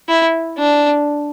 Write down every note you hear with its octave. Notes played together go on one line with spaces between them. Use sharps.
E4
D4